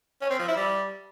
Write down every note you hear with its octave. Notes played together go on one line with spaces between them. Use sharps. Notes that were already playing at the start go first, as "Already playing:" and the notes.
C#4
C4
F3
E4
G3